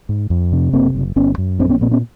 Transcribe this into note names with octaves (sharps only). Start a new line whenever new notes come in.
G#2
F2
C3
F#1 A#3 C4
F#1
G1 B3 C#4
F#2
A#1 C4 D4
B3 C#4
A#2 A#3 C4
B3 C#4